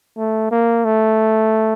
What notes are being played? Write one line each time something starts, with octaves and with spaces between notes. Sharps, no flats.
A3
A#3
A3